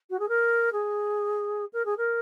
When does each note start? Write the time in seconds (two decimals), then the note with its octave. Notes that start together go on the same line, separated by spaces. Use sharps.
0.10 F#4
0.19 G#4
0.29 A#4
0.72 G#4
1.73 A#4
1.85 G#4
1.97 A#4